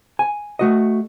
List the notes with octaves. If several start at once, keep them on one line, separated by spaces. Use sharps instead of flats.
G#5
A3 F#4 D#5